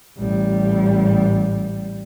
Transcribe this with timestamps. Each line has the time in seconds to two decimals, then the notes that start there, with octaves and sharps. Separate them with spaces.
0.18 A1 G3